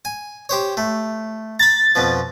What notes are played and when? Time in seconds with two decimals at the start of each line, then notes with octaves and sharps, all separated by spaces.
0.05 G#5
0.49 G4 C5 C#5
0.77 A3
1.59 A#5 B5 A6
1.95 F2 B2 F3